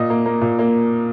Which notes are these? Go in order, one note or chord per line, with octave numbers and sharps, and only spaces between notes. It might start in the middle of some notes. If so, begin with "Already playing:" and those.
Already playing: A#2 D#5
A#3
A#3
A#2
A#3